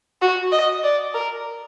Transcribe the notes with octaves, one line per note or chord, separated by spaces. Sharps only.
F#4
D#5
D5
A#4